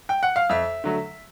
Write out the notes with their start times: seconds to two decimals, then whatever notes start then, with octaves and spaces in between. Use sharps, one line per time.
0.09 G5
0.23 F#5
0.36 F5
0.49 F2 E5
0.84 D3 F#3 A3